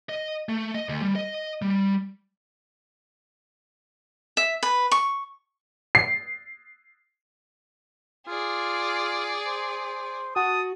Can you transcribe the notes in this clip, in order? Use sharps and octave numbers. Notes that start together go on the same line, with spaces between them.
D#5
A3
D#5
D2
G3
D#5
G3
E5
B4
C#6
C7
F4 G#4 D5
C5
F#4 A5 D#6